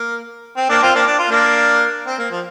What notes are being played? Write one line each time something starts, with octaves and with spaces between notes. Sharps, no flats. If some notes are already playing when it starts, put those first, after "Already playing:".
Already playing: A#3
C4
A#3 D4
C4 F4
A#3 D4
D4
F4
A#3 D4
C4
A#3
F3